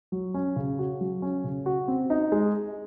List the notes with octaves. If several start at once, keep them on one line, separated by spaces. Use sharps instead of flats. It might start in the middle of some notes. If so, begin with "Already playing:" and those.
F#3
C#4
C#3
F#4
F#3
C#4
C#3
F#4
C4
D#4
G#3